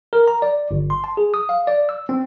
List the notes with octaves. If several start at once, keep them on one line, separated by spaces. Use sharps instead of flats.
A#4
A#5
D5
G1
C6
A5
G#4
D#6
F5
D5
E6
C4